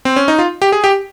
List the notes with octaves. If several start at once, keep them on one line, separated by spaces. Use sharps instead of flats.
C4
C#4
D#4
F4
G4
G#4
G4